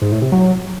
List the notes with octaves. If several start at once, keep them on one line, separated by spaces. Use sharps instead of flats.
G#2
A2
C3
F#3